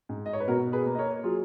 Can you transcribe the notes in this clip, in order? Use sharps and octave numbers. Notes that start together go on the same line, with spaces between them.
G#2
D#5
C#5
B4
B2 F#4 A#4
G#4 B4
A#3
D#5
A#4 C#5
F#3 F4 G#4